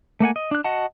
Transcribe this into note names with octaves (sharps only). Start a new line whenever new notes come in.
A3 A#3 F#5 G#5
D#5
D4 F#6
F#4 D#5 F#5 A5